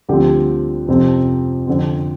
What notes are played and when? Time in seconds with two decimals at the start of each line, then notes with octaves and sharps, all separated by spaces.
0.09 D2 D3 F3 G3 C4 G4
0.88 F2 C3 F3 C4
1.67 F2 D3 F3 C4